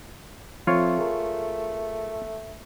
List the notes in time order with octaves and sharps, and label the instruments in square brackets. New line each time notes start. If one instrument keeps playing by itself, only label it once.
[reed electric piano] F3 C4 [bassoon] A3 [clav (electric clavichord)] F4 C#5
[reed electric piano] G#4 A#4